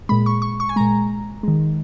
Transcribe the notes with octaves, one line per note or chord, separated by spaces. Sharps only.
A#2 G#3 B5
C#6
C#6
C#6
G#5
A#2 G#3 A#5
D#3 G#3